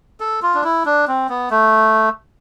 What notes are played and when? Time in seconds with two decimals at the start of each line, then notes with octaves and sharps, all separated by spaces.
0.20 A4
0.42 F4
0.55 D4
0.64 E4
0.86 D4
1.08 C4
1.29 B3
1.51 A3